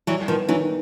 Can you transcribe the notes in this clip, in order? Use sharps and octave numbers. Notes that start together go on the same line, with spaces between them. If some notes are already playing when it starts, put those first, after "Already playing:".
E3 F#3 G3
D#3 F3 B3
D#3 E3 F#3